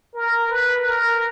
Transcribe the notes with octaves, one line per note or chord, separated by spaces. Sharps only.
A#4
B4
A#4